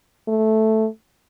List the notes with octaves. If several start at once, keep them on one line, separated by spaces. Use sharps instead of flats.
A3